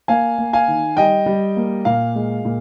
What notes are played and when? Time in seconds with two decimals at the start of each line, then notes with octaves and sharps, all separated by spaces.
0.08 A#3 F5 G#5
0.38 A#3
0.53 F5 G#5
0.68 D#3
0.97 G3 D#5 G5
1.26 G3
1.57 A#3
1.85 A#2 F5
2.16 G#3
2.45 A#2